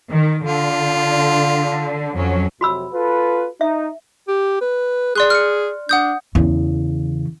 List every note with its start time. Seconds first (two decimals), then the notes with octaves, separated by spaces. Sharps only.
0.11 D#3
0.45 D3 F4
2.16 F2 F#3 C#4
2.61 F2 C3 F#3 F#4 B5 E6
2.93 F4 A4 B4
3.61 D#4 E5
4.28 G4
4.61 B4
5.16 G#4 D5 C6 F#6
5.30 F6 C#7
5.89 D4 F#5 D#6 G6
6.35 E2 C#3